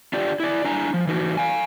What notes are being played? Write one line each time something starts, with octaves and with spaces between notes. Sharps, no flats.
D4 F4 G4 D5
E4 D5
D4 E4 G#5 A#5
F3
E3 D#4 F#4
F5 G#5